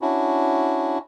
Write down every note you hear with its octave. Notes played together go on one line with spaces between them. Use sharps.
C#4 D4 E4 F#4